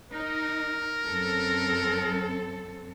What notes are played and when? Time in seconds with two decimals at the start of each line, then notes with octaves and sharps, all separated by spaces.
0.11 D#4 A#4
1.05 F#2 C4 A4